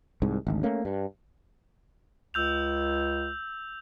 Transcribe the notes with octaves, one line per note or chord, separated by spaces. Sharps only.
C2 G#2
G#1 D2
A3 A#3 C#4
G2
C#2 E6 G6 F7